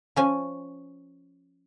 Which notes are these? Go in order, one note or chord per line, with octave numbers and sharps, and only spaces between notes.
F3 C#4 G#5